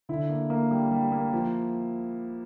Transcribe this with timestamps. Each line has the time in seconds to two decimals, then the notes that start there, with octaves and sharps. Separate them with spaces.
0.09 D3 E4
0.29 A#3
0.50 A#3
0.71 G3
0.91 G3
1.12 A#3
1.33 F3